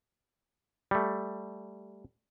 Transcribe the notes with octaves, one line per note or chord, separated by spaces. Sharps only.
G3 A3